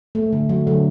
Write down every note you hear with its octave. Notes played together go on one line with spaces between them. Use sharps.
A3
D3
F#3
D3